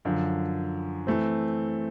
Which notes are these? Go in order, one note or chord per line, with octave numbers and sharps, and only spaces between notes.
F#2 D3 F3
E3 A3 C4